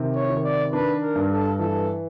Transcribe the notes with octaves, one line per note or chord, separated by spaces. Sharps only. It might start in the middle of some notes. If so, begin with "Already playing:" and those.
Already playing: C3 D#3
C#5
D#3
D5
D4 B4
A#4
G2
A4
E3 A4